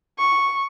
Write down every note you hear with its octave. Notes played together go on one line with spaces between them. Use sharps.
C#6